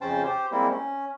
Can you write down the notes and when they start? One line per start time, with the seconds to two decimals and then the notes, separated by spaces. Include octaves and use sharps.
0.01 F2 C#3 C#4 C5 G5 A5
0.24 G4 C5
0.52 G3 G#3 A#3 C4 E4
0.71 C#4